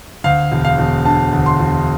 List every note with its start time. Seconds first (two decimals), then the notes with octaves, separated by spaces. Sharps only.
0.24 D2 F5
0.52 E1
0.65 F5
0.78 E1
1.06 D3 A5
1.33 D2
1.46 C6
1.60 E1